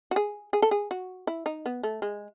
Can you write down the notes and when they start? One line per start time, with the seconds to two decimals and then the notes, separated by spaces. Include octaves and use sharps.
0.11 F#4
0.16 G#4
0.53 G#4
0.62 A4
0.71 G#4
0.91 F#4
1.27 E4
1.46 D#4
1.66 B3
1.83 A3
2.02 G#3